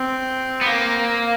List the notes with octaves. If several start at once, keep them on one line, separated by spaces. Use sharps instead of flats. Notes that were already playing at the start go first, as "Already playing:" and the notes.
Already playing: C4
B3
A#3